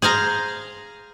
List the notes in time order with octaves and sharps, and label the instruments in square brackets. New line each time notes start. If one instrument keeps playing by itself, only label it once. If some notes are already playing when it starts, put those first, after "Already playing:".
[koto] G#4 C5 F5 A#5